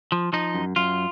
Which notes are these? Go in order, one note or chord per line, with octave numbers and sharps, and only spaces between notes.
F3
F3 D#4
F#2
F#2 F4